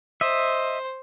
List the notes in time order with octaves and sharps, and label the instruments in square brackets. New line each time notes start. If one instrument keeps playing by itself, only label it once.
[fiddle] C5 [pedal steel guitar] D#5 E5